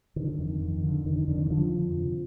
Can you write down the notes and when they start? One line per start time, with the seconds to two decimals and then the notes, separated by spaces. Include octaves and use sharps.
0.16 D3 D#3
0.39 F2
0.61 F2
0.83 D3
1.05 D3 D#3
1.16 D#3
1.28 F2 D3
1.39 D#3
1.50 F2 D3 F3
1.73 D3
1.95 C3